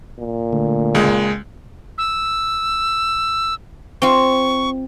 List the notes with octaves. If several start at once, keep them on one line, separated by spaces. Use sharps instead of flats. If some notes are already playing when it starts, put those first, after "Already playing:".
A#2
D3 A3
C#2 G#3
E6
C4 F4 C#6